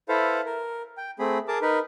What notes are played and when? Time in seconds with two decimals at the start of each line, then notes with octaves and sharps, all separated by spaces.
0.09 E4 A4 B4 C5 F5
0.46 A#4
0.97 G5
1.19 A3 C4 G#4 B5
1.48 G#4 A#4 A5 D6
1.62 D#4 A#4 B4